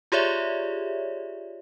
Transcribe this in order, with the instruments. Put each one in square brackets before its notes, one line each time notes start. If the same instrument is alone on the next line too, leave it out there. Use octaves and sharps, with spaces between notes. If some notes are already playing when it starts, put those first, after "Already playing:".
[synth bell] F4 G4 G#4 C#5 D5 E5